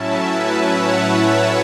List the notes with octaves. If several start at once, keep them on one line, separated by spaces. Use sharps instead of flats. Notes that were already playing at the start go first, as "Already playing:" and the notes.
Already playing: A2 F#3 C#4 E4 E5 A5
B4 E5
C#5 F#5